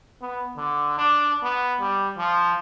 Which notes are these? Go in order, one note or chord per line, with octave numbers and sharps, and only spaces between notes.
B3
D3
D4
B3
G3
F3